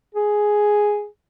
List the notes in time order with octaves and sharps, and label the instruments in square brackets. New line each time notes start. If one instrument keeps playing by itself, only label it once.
[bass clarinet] G#4